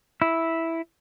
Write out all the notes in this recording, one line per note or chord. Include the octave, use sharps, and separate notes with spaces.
E4